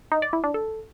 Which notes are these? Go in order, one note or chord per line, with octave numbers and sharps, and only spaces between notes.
D#4
D5
E4
D4
A4